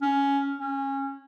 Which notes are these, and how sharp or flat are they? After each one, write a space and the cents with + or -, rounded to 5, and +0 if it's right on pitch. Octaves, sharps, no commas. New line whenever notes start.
C#4 +10
C#4 -20